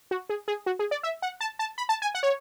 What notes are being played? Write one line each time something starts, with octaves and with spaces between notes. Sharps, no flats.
F#4
G#4
G#4
F#4
G#4
D5
E5
F#5
A5
A5
B5
A5
G#5
F#5
C#5